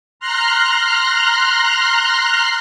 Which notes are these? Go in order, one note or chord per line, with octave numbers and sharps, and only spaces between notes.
A#5 C6 F6 F#6